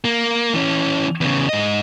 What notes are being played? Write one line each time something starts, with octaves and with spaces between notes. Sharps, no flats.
A#3
E3 C#4
E2 C#3
G#2 D#5